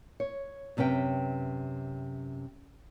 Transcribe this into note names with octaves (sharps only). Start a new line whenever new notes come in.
C#5
F#2 C3 C#4 B4 G5